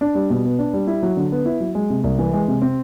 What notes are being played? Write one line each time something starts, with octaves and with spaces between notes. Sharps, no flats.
D4
G3
B2
B3
D4
G3
E4
F#3
D3
B3
E4
F#3
G#3
C3
C2
E3
G#3
C3
C4